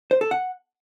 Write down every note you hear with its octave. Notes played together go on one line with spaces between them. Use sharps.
C5
A4
F#5